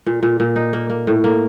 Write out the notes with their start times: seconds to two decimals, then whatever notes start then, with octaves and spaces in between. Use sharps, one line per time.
0.06 A#2
0.23 A#2
0.40 A#2
0.56 D#4
0.73 A#3
0.90 A#3
1.07 A2
1.24 A#3